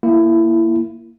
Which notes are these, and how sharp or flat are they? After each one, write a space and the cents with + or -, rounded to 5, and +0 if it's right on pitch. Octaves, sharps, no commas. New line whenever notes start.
A#3 +0 E4 +15